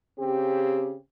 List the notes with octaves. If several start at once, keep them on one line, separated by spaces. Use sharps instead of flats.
C#3 C4 G4